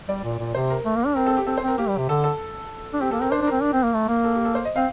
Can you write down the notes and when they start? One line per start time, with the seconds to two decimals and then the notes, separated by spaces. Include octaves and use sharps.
0.08 G3 D5
0.24 A#2
0.39 A#2
0.54 C3 C5
0.70 A#4
0.85 A3
0.96 A#3
1.06 D4
1.16 C4 A#4
1.26 A4
1.37 G4
1.47 C4 A4
1.57 C5
1.63 C4 A#4
1.78 A#3 G4
1.88 G3
1.98 C3
2.09 D3 A4
2.24 A4
2.93 D4
3.01 C4 G4
3.11 A#3 A4
3.21 C4 A#4
3.31 D4 C5
3.42 D4
3.47 C4 A#4
3.62 D4
3.73 C4
3.83 A#3
3.94 A3
4.08 A#3
4.24 A4
4.35 G4
4.45 A4
4.55 C5
4.65 D#5
4.76 C4 F5